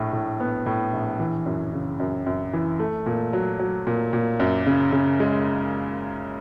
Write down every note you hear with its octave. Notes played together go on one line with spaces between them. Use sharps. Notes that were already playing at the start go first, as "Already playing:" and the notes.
Already playing: A#1 A2
A2
B3
A2
A#1
E3
F#2
C#3
F#2
F#2
E3
A3
A#2
F#3
F#3
A#2
A#2
F#2
C#3
C#3
G#3